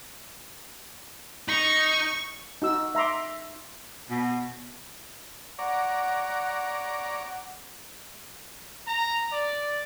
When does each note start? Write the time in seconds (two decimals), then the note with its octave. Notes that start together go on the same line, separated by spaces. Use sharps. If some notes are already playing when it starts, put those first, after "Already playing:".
1.48 D#4 C#6
2.62 D#4 F#4 E6
2.95 E5 A#5 C6 D6
4.10 B2
5.59 C#5 D5 F#5 A#5
8.87 A#5
9.31 D5